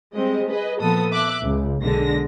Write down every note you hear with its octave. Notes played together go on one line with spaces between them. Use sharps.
G3 G#3 C4 D#5
G#4 B4 D#5
A#2 F3 B3 A4 D#6
E5 D6 F#6
C#2
B1 D3 G#3 A#6